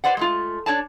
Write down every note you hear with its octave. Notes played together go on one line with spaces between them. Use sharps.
G4 B4 C5 D5 F#5
G#3 A3 F4
D4 C#5 D5 A5